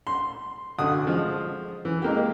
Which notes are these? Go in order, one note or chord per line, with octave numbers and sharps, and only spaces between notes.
C6
D2 G2 F#4 D#6
F3 G#3
E3
G#3 A#3 G4